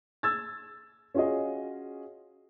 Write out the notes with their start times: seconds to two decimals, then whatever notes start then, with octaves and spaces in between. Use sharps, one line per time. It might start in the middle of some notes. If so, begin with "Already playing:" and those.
0.23 E6 G#6 A6
1.14 C#4 F4 F#4 G#4 D#5